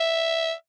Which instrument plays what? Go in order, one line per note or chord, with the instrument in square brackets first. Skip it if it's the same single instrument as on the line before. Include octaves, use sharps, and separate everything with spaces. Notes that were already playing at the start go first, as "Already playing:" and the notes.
Already playing: [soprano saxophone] E5